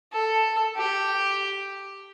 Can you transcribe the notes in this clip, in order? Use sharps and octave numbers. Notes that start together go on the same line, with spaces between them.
A4
G4